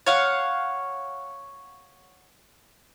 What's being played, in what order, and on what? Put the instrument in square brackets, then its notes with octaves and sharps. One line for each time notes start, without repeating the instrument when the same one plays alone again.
[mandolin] C#5 F5 F#5